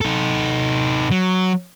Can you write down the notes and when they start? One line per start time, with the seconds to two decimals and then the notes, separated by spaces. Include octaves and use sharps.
0.01 D#4 A4
1.11 F#3